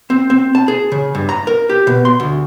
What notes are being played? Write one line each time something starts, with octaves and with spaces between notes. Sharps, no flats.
C4
C4
A5
G#4
C#3
G2
A#5
A#4
G4
B2
C6
D2